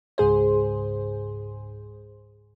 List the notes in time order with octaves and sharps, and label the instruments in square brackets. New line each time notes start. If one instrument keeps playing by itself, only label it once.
[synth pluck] C#2 G#2 G#4 C5